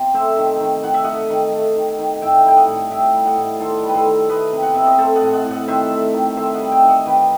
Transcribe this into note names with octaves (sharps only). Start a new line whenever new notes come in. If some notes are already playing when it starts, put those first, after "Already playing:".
Already playing: C3
A3 C5 E5
D#3
D#3
D#3 F#5
E5
A3 D#5 F#5
D#3
A3
D#3
D#3
A2 E5 G5
G3 G5
D#5 F#5
A2
A2 E5 G5
G3
D#5 F#5
A2
D#3 A4 C5
G3
B4
A4 C5
D#3
A3 B4 D#5
C3
F#5
C3 E5
D#5
A3 A4 C5
D#5 F#5
A2
D#5 F#5
A2
D#5 F#5
D#3 C5 E5
A3
D#3
D#3 C5 E5
D#5 F#5
G3
E5 G5
D#3
D#5 F#5
D#3 G4 B4